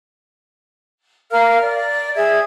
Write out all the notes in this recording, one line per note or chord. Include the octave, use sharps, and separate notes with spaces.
A#4 F5 F6
D5
G#4 E5 G#6